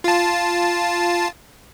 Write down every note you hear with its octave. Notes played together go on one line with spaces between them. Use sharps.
F4 A5